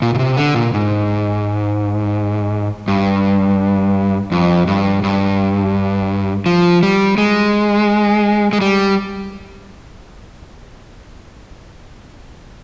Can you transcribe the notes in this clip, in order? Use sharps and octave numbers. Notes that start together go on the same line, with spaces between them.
A#2
A#2
C3
D3
A#2
G#2
G2
F2
G2
G2
F3
G3
G#3
G#3
G3